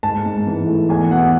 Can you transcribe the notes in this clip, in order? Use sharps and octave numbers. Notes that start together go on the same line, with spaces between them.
G#2 A5
G#2
E3
A3
E2 G#5
B2 F#5